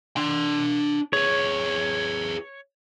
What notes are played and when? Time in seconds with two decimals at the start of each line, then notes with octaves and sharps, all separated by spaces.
0.17 D4 C6
1.13 G#4 B4 C#5